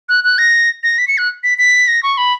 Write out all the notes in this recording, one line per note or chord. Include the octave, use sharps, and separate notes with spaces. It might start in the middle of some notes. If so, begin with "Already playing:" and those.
F#6
F#6
A#6
A#6
B6
C#7
F#6
B6
B6
A#6
C#6
B5